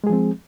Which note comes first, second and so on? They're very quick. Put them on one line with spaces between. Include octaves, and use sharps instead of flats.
G#3 G#4 F3 C4